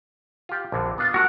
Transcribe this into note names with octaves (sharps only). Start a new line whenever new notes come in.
F4 G4
A#1 F2 D3
B3 D4 F4
A3 D#4 F#4 A#4 F#5